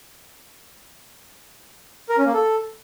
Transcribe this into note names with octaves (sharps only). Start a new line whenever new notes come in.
A#4
C#4
A#3
A4